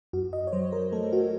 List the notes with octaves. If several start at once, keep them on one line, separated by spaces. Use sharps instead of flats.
F#2 F#4
D#5
C#5
F#3 C5
A#4
A3 A4
F#4